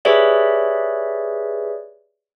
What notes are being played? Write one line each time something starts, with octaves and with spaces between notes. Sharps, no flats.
G4 G#4 B4 C#5 D5 E5